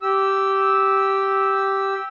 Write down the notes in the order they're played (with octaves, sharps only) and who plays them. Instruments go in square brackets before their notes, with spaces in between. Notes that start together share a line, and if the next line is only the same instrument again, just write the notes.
[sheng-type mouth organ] G4 E6